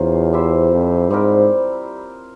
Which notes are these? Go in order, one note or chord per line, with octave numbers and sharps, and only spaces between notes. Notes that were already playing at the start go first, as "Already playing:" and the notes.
Already playing: E2 A#3 C#4 F4 C5
E4 G4 C5 E5
F2
G#2 G3 C4 G4 A#4